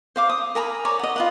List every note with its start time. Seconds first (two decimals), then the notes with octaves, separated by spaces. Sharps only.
0.16 C5 F5 D6
0.30 D#6
0.55 A#4 G#5 A#5 B5
0.85 C#5 D5
0.99 D#5 F#5
1.16 F4 B4 F#5